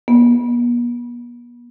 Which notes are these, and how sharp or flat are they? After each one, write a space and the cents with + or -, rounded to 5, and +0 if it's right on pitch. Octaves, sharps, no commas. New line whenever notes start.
B3 -45